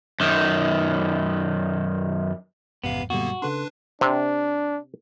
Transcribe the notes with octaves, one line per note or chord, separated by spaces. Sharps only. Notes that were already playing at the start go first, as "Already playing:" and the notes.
F#2 D#3
A1 F2 G#2 C3 B3 F5
F#2 A#2 D3 G3 A#3 B3 F#4
C#3 D4 A4 B4 C6
C3 D4